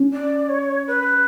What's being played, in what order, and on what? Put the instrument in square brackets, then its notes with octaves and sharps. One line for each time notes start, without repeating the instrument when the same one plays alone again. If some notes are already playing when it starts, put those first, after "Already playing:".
Already playing: [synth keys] C#4
[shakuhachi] D5
C#5
B4